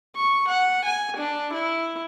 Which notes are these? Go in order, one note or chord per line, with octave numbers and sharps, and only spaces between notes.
C#6
F#5
G#5
D4
E4